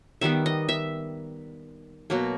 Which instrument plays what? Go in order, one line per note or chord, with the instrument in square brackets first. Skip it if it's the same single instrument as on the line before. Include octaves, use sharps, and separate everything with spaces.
[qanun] D#3 G3 B3 E5
D#5
E5
B2 F#3 A#3